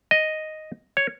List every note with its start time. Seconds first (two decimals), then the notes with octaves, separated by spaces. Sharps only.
0.11 D#5
0.97 C#5